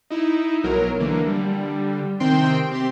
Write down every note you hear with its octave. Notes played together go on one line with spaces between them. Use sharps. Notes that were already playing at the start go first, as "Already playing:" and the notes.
D#4 E4
B1 F#3 A#4
D3 E3 A#3
D3 G3
C3 D#3 C4 G5 C6
C4 G4 C6